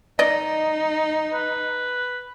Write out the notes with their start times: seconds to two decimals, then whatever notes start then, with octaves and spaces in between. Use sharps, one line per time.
0.19 D#4 D5 D#5
1.33 B4